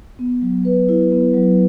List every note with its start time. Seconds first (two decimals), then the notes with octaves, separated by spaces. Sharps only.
0.19 B3
0.42 F#3
0.65 B4
0.89 E4
1.12 B3
1.34 F#3